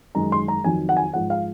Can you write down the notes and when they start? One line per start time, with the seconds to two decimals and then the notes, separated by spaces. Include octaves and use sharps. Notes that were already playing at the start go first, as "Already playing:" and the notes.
0.15 F#2 D#3 G#3 A#5
0.32 C6
0.48 A#5
0.64 F2 D#3 F#3 G#5
0.89 F#5
0.97 G#5
1.13 G#2 F3 G#3 F#5
1.30 F5